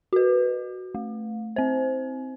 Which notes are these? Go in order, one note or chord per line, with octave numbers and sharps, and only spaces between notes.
F#4 B4
A3
C4 C5